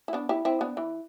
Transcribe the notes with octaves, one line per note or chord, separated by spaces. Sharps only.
E4
B3 D4
E4 G4
C4 E4
B3 D4
E3